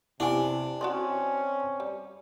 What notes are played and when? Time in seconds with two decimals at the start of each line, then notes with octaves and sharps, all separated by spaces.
0.20 C3 B3 D4 E4 G4 G#5
0.81 C4 C#4 F#4 D5 D#5 C6
1.80 G3